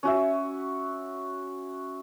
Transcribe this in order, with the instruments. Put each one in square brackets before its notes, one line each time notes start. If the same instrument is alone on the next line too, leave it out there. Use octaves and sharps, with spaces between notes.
[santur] C#4 F#4 E5